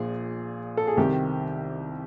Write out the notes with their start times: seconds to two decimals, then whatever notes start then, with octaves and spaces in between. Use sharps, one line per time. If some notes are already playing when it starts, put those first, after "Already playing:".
Already playing: A#1 A#2 G#4
0.77 A4
0.87 G#4
0.97 C2 C3 D#3 G4